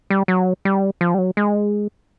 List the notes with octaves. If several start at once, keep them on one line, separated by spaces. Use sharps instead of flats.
G3
F#3
G3
F3
G3
F#3
G#3